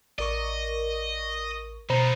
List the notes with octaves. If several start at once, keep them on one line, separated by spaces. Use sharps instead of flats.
A1 A#4 D5 D#5 C#6
B2 D#4 F4 C5 A#5 B5